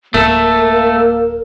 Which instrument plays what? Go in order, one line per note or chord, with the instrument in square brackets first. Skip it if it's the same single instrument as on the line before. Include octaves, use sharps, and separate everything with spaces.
[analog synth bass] D1 [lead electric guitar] A3 A4 [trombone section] A#3 [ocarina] A#4